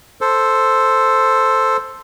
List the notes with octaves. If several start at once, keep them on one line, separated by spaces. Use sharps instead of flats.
A4 C5